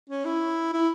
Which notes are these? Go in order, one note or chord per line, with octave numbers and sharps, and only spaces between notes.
C#4
E4
E4